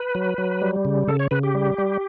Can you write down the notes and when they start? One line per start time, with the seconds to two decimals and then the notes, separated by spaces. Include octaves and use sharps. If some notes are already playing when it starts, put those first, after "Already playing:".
Already playing: B4
0.15 F#3
0.38 F#3
0.62 G3
0.85 C#3
1.08 C#3 A4
1.19 C#5
1.31 C#3 B4
1.43 G4
1.55 G3
1.78 G3